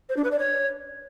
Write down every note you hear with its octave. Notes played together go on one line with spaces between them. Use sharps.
C5
D4
B4
D5
C#5